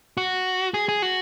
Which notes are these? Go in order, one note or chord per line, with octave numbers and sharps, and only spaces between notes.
F#4
G#4
G#4
F#4